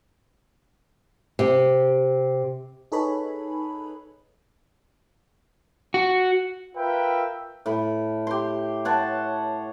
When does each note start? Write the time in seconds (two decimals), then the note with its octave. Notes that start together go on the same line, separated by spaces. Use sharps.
1.39 C3
2.92 D#4 G#4 A4 B4 C#5 B5
5.94 F#4
6.76 F4 A#4 B4 E5 G5
7.66 A2 B5
8.27 G4 C6
8.85 C#5 F#5 A5 C6